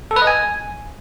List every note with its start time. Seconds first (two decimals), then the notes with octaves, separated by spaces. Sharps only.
0.11 A4
0.16 B4
0.22 D#5
0.27 G#5